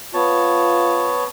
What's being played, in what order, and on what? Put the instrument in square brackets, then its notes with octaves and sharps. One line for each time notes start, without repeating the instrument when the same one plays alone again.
[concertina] B3 C#5 A5 [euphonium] F4